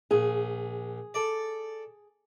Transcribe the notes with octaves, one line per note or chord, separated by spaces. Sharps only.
A#1 G#4
A4 D5